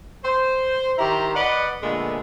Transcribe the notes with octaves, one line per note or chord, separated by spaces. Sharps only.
C5
D#3 E4 G4 C5 A#5
B4 D5 D#5 F#5
A#2 D3 G#3 A3 B3